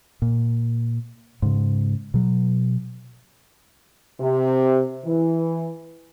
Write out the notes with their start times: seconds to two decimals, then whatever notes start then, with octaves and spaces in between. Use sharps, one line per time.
0.22 A#2
1.42 G#2 C#3
2.14 B2 F#3
4.19 C3
5.04 E3